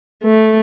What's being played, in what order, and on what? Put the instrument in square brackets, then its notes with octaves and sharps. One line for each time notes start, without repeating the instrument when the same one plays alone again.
[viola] A3